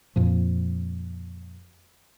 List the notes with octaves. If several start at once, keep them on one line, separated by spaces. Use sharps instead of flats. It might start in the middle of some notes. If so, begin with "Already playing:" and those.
F2 A#2 F3